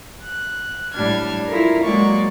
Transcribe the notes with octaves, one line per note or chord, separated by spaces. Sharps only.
F#6
A2 G3 D4 F6 G#6
E4 F4 A4 A#4
F#3 G#3 A#3 D5 C#6